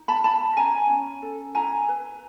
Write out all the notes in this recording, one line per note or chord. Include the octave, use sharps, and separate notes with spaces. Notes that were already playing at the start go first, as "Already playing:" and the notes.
Already playing: D#4
A5 B5
E4 A5 B5
C#4 G#5 A#5
C#4
A4
E4 G#5 A#5
B4